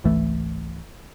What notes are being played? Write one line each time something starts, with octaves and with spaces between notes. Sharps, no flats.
G#1 C#2 E3 A3